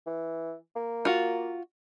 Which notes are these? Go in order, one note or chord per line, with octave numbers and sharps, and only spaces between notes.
E3
A#3
F4 F#4